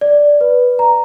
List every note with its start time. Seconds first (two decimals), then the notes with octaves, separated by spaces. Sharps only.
0.01 D5
0.41 B4
0.79 A#5